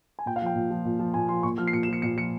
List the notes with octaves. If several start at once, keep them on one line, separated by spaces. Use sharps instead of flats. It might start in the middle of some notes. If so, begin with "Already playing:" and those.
G#5
A#2 G5
F5
F3 G5
A#2
F3
A#2
F3
A#2 G#5
F3 C6
A#2 C#6
F3 F6
C7
A#2 C#7
E7
F3 C#7
A#2 C#7
F3 C#7